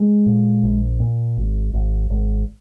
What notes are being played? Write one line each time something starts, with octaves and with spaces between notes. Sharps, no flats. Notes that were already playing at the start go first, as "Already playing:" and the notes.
Already playing: G#3
A#2
A#1
A#2
G#1
G#1
G#1